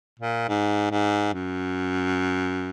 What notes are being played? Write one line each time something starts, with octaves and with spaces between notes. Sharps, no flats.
A#2
G#2
G#2
F#2